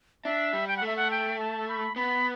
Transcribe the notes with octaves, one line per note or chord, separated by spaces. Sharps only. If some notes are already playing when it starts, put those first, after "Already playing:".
D4 E5
G3
G5
A3 F#5
E5
F#5
G5
A5
B5
B3 B5